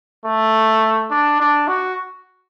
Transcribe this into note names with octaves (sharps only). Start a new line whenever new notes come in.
A3
D4
D4
F#4